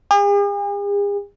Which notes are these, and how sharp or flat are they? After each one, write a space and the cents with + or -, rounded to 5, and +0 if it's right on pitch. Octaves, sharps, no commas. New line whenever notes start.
G#4 -45